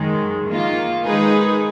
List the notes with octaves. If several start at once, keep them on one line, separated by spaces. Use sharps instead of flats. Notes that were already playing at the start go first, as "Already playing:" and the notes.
Already playing: F#2 D#3 G#3
D#3 A#3 F4
D#3 G#3 D#4 G#4 B4